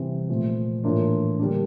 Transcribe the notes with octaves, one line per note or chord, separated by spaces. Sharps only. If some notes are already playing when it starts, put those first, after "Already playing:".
Already playing: C3 E3 G3 C4
A#2 F3 A3
A2 E3 A#3 D4 F4
D3 G3 A#3 D4